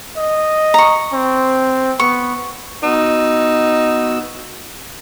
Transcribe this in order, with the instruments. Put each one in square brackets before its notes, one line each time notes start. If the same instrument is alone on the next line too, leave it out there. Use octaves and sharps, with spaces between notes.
[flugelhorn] D#5
[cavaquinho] A#5 C#6
[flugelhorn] C4
[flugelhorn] B3 [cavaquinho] C#6
[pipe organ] B3 F#4 E6 [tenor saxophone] D#4